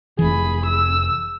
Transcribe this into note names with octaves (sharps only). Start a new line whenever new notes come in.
F1 E3 G#4 B5
E6